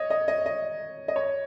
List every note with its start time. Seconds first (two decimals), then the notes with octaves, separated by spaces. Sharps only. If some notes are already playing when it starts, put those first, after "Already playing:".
Already playing: C#5 D#5
0.10 D#5
0.28 D#5
0.46 D#5
1.08 D#5
1.16 C#5